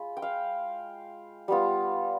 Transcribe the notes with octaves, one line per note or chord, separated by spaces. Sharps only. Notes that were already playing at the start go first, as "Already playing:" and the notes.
Already playing: G#3 F4 B5
G5
F5
G3 B3 F4